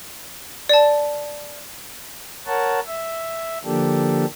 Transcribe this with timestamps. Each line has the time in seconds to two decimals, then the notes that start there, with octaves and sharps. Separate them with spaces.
0.69 D5 A5
2.46 A#4 C#5 F#5 A5
2.87 E5
3.64 D3 F3 A#3 D4 G4 A4